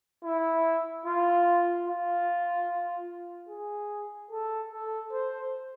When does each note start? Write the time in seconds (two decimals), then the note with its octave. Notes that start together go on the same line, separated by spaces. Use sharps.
0.24 E4
1.06 F4
1.87 F4
3.49 G#4
4.31 A4
4.71 A4
5.12 C5